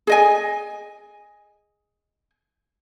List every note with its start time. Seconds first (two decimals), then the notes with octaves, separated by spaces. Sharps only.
0.07 G#4 D#5 G#5